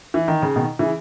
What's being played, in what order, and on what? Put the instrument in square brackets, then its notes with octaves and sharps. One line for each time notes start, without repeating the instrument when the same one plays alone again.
[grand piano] E3
D#3
C#3
B2 D#3
C#3 E3